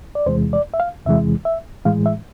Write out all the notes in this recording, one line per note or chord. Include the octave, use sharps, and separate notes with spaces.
D5
E2 C3 E3 G#3 C5
D5
E5
F5
E2 C3 E3 G#3 E5
E5
A2 E3 G#3 F5
E5